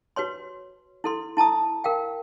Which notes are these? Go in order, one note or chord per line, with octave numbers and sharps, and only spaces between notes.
F#4 B4 C#5 C6
E4 A4 C6
E4 A5 A#5 D#6
A#4 F5 G5